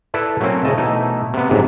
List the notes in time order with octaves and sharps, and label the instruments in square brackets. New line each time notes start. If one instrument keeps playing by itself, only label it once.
[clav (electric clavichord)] E4 A4 B4 D5
F#3 A3 A#3 C4 C#4
A2 C#3 A3 D#5 A5
B2 E3 A3 D#4 E4
C3 B3
G1 F2 G#2 C3 E3 F#3